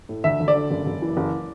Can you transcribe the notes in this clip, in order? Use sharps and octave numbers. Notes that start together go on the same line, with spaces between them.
A2
D2 E5
D2
D5
D3
F#1
F#1
E3
F#1